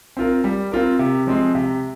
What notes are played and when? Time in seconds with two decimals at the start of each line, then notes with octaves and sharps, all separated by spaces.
0.17 C4 F4 A#4
0.44 G3
0.72 C4 F4 A#4
0.99 C3
1.27 F3 G#3 C4
1.55 C3